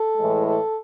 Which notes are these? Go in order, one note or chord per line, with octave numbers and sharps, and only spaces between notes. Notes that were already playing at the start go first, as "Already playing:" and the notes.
Already playing: A4
A2 E3 G#3
A4